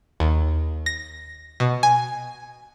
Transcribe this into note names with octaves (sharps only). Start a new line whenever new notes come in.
D#2
A#6
B2
G#5